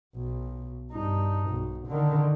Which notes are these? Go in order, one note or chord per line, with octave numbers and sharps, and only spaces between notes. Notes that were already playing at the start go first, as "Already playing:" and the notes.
B1
G2 D#4
B1
D3 D#3